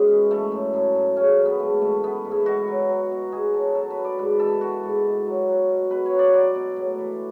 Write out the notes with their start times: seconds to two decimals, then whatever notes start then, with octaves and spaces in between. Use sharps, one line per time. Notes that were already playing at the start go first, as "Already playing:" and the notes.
Already playing: F#2 B2 G#3 B3 C#4
0.09 E3
0.31 E3 A3
0.52 F#2
0.73 F#2
0.95 F#2
1.16 C#3 C#4
1.39 E3
1.45 B3
1.60 G#2 A3
1.82 E3 A3
2.03 E3 B3
2.25 G#2
2.32 E4
2.46 B2 F#4
2.68 F#3
2.89 F#3
3.11 B2
3.32 B2 G#4
3.54 F#3 A4
3.75 F#3 A4
3.90 B4
3.98 B2
4.04 D5
4.18 G#2 B4
4.39 E3 A4
4.61 E3 F#4
4.83 G#2
5.04 B2
5.27 F#3
5.48 F#3
5.70 B2
5.91 B2 B4
6.06 C#5
6.13 F#3
6.19 D5
6.33 F#3 D5
6.56 B2
6.76 A2
6.98 E3